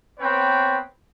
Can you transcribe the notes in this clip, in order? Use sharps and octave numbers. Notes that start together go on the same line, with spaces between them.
B3 C4 B4 C#5 G5